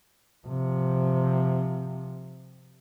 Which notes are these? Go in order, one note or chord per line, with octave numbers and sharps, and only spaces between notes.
C3 F3